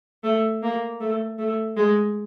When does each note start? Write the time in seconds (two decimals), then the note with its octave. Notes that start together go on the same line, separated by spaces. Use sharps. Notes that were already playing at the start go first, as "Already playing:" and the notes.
0.23 A3
0.63 A#3
1.00 A3
1.38 A3
1.76 G#3